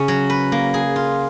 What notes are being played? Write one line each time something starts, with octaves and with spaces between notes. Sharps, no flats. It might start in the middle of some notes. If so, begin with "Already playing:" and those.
Already playing: C#3 C#4 G#4
F#3
B4
A#3
G#4
F4